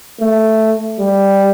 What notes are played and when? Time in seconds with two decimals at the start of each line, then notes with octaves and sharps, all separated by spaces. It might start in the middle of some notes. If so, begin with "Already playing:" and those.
0.21 A3
0.99 G3